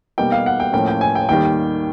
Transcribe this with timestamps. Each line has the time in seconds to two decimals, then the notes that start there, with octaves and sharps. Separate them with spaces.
0.18 B2 G3 A#3 D#4 G5
0.32 F5
0.46 F#5
0.60 G5
0.73 A2 F3 A#3 C#4 G5
0.87 G5
1.01 G#5
1.15 G5
1.28 D#2 D#3 G3 G5